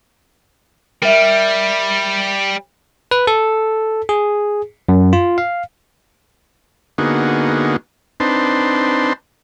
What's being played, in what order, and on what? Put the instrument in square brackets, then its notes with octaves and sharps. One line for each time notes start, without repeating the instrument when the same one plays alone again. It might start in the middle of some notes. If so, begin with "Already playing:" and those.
[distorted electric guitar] G3 [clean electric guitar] A#4 E5
[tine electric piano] B4
A4
G#4
F#2
F4
F5
[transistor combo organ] D3 A#3 B3 D#4 F#4 G#4
C4 D4 D#4 B4 A5 C6